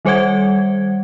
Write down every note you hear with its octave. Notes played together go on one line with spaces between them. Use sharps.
D#3 G3 C5 C#5 F#5 G#6